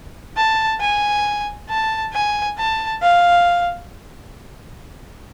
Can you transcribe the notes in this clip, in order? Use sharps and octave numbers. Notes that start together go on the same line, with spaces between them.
A5
G#5
A5
G#5
A5
F5